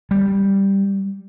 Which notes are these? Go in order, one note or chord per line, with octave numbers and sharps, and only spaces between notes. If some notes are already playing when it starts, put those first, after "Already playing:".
G3